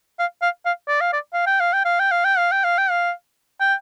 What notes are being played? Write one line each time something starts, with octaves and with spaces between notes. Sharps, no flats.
F5
F5
F5
D5
F5
D5
F5
G5
F5
G5
F5
G5
F5
G5
F5
G5
F5
G5
F5
G5